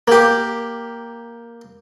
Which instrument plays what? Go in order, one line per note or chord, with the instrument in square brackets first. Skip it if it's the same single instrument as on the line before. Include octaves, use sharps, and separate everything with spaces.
[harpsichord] A#3 G4